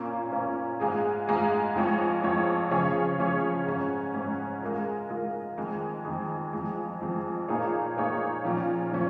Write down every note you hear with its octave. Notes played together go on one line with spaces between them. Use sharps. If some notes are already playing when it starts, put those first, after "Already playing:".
Already playing: A#2 A#3 C#4
A#2 A#3 C#4
G#2 G#3 F4 G#4
G#2 G#3 F4 G#4
F2 F3 G#3 F4 C#5
F2 F3 G#3 F4 C#5
C#3 F3 C#4 G#4 C#5
C#3 F3 C#4 G#4 C#5
G#2 G#3 C#4
G#2 G#3 C#4
G#3 F4 A#4
G#3 F4 A#4
F2 D#3 G#3
F2 D#3 G#3
F2 F3 G#3
F2 F3 G#3
A#2 A#3 D#4 G#4 C#5
A#2 A#3 D#4 G#4 C#5
A#2 F3 C#4
A#2 F3 C#4